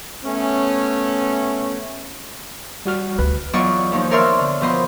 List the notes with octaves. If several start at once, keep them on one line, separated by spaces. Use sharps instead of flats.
A3 B3 C#4
G3 F#4 F6
D2 B4
E2 F#3 F4 D5 D#5 C#6
D#2 F3 D#4
A#4 C#5 D5 E5 C6 F6
D3
B2 F3 B4 D#5 C6